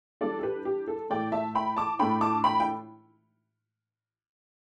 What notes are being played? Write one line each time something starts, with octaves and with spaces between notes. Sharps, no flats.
E3 G3 D4 A4 D5
A4
G4 B4
G4
A4
A2 E3 A3 D5 G5
E5 A5
G5 B5
A5 D6
A2 A3 D4 G5 B5
A5 D6
G5 B5
G5